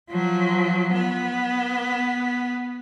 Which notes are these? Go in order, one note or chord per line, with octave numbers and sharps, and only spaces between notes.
F3 F#3
B3